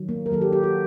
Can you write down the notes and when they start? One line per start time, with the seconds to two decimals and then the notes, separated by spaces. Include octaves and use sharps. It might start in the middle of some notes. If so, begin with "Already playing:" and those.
Already playing: D#3 F#3
0.09 A#3
0.26 A#4
0.30 D#3 F#3 A#3 A4
0.41 G4
0.52 G4
0.64 F#4